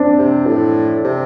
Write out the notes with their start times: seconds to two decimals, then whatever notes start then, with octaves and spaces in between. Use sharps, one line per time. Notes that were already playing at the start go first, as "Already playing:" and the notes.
Already playing: C4 D4
0.19 C3
0.47 A2
1.05 C3